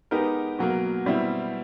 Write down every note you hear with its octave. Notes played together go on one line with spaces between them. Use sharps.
G#3 B3 D#4 G4 A#4
B2 F#3 A#3
B2 G3 C4 E4